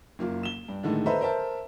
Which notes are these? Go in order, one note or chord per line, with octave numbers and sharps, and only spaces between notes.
F#1 A#3 F4
E7 G7
G2
A2 D3 D#3 G#3 A3
A4 B4 C5 D#5 E5 A#5
A#4 C5 E5 A5